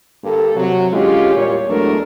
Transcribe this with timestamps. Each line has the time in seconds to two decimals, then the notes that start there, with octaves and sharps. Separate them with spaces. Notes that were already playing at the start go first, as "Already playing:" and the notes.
0.24 G2 D3 A#3 G4 A4
0.56 C3 F#3
0.92 D3 G#3 C#4 F4 G4
1.34 E2 A#2 G3 C#5
1.69 E2 F#3 G#3 A3 D4 A#4